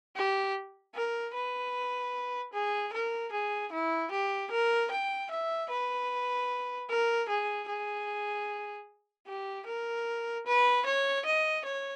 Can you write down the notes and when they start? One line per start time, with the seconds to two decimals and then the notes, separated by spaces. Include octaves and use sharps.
0.16 G4
0.95 A#4
1.34 B4
2.53 G#4
2.93 A#4
3.32 G#4
3.72 E4
4.11 G4
4.51 A#4
4.91 G5
5.31 E5
5.70 B4
6.89 A#4
7.29 G#4
7.68 G#4
9.27 G4
9.66 A#4
10.47 B4
10.86 C#5
11.25 D#5
11.65 C#5